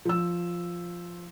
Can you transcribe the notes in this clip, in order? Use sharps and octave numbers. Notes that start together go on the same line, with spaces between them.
F3 E6